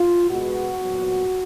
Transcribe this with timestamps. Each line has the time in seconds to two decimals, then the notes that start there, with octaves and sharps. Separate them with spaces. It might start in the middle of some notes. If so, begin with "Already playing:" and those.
Already playing: F4
0.29 B2 G#3 B3 F#4
0.81 A#2 F#3 B3